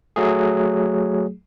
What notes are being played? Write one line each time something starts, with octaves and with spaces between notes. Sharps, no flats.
F#3 A3 G#4